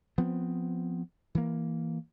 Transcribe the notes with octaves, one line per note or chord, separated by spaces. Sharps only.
F3 B3 C4
E3 A#3